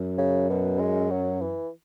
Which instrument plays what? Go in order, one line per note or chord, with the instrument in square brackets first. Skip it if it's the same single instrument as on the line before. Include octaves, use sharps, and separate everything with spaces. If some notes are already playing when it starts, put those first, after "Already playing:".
Already playing: [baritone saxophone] F#2
[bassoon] C#3
B2
G#3
F#3
E3